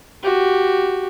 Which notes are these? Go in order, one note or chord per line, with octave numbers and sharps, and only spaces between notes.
F#4 G4